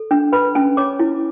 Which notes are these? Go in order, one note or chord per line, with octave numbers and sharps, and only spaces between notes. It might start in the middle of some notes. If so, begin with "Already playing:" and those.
Already playing: A4
D4
B4 B5
C#4 A5
C#5 D6
E4